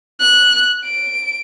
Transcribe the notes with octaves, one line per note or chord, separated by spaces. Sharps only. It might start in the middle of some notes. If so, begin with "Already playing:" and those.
F#6
D7